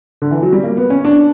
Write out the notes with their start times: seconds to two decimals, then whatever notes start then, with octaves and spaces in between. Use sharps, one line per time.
0.22 D3
0.31 E3
0.42 F#3
0.52 G3
0.63 A#3
0.77 B3
0.90 C#4
1.05 D4